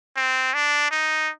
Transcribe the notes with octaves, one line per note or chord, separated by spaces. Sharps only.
C4
D4
D#4